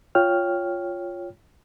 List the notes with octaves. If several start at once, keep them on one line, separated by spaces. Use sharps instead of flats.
F4 C#5 G5 F6